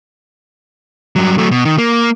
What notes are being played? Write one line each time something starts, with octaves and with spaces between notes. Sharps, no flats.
G2 F#3
F#3 A3
B2
D#3
A#3